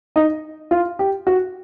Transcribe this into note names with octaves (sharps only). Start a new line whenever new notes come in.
D#4
F4
G4
F#4